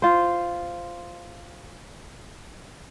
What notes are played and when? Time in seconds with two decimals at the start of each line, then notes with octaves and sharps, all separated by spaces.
0.02 F4 C5